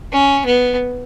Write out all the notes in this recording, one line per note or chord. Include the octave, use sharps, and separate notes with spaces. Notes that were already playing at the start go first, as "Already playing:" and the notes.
C#4
B3